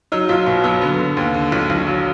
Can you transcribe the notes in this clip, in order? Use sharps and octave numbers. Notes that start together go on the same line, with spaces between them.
F#3 D#4
B1 F4
B2
F#3 B3
D3 B3
D3
D#2
D3
B1
B1
F#3